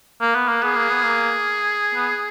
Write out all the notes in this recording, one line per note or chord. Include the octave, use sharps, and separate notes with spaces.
A#3
B3
A#3
B3 G#4
A#3
B3
A#3
B3